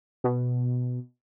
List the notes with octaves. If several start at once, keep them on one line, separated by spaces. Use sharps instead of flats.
B2